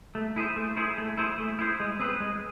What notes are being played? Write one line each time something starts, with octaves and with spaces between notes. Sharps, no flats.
A3
E4 G#4 C5
A3
E4 G#4 C5
A3
E4 G#4 C5
A3
E4 G#4 C5
G#3
C4 G#4 B4
G#3